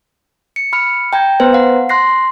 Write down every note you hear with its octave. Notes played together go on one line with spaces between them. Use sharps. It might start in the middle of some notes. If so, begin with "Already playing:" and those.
C#7
B5 F6 C#7
G5 A#5 G6 G#6
B3 B4 C5 A#5
F5 F#5
C6 F#6 A#6 C7